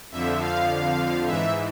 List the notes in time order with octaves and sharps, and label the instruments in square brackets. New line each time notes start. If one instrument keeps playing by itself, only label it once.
[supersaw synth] F2 D3 F3 E5
F5
G#2 E3 E5